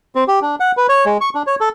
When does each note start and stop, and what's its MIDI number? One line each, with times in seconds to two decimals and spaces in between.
0.15 0.24 60
0.28 0.40 67
0.42 0.55 62
0.60 0.72 78
0.77 0.87 71
0.89 1.05 73
1.06 1.17 56
1.21 1.29 85
1.35 1.43 62
1.47 1.55 73
1.61 1.69 69